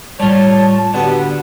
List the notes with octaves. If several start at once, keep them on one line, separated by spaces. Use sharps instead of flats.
A2 G3 F4 C#5 D5 A5
D3 B3 F#4 G4 D5